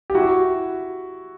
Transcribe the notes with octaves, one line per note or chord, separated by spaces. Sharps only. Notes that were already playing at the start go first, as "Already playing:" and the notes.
G4
E4 F#4